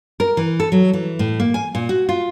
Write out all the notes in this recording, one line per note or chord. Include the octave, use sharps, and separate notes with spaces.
A#4
E3
A4
F#3
E3
A2
A#3
G#5
A#2
F#4
F4